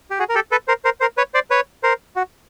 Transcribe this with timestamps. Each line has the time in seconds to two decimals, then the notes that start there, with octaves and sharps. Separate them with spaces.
0.11 G4
0.19 F#4 G#4
0.29 A#4
0.35 G4 A4
0.51 A4 B4
0.68 A#4 C5
0.85 A#4 C5
1.01 A#4 C5
1.17 B4 C#5
1.34 C5 D5
1.50 B4 C#5
1.83 A#4 C5
2.16 F#4